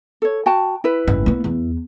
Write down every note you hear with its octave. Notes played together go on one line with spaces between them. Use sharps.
A4 C#5
F#4 G5 A5
E4 B4
F#1 G#2
A#3 B3
E2